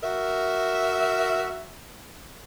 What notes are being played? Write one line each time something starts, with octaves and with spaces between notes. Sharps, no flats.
F#4 A#4 E5